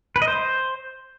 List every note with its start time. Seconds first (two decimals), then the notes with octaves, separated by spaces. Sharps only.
0.16 B4
0.22 D#5
0.28 C5